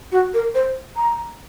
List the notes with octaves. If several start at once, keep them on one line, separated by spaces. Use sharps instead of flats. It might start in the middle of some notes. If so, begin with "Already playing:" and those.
F#4
A#4
C5
A#5